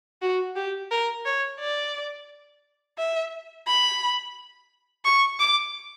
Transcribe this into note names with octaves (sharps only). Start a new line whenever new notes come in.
F#4
G4
A#4
C#5
D5
E5
B5
C#6
D6